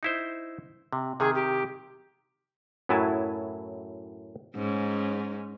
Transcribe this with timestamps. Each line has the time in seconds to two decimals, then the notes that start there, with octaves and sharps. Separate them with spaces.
0.03 D#4 E4 C5
0.93 C3
1.20 C3 D#3 G#4
1.35 G4
2.89 F#2 A2 F#3 E4 G#5 A5
4.56 G#2 C#4